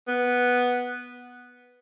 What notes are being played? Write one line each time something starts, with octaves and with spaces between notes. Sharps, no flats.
B3